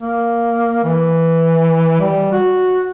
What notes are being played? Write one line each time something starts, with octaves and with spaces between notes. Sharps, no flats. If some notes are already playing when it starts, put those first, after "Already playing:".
A#3
E3
G3
F#4